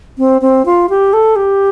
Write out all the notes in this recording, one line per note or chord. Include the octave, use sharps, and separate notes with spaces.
C4
C4
F4
G4
A4
G4